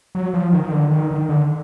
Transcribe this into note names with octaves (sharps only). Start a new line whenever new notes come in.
F#3
F3
D#3
D#3
D3
D#3
D#3
D3